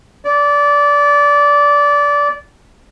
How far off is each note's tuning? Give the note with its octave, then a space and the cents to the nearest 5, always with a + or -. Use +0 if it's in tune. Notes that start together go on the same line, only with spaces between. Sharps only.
D5 -20